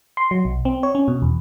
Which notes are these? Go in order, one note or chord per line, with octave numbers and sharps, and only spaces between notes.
C6
F#3
B1
C4
C#5
C#4
B2
E2